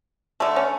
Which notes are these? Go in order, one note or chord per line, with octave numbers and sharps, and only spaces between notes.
D3 A3 D4
C#4